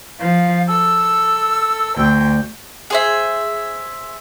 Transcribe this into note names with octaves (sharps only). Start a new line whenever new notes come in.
F3 F5
A4 E6
D2 G5
G#4 C5 E5